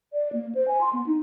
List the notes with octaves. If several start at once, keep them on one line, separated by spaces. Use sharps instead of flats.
D5
A#3
C5
G#5
C6
B3
D#4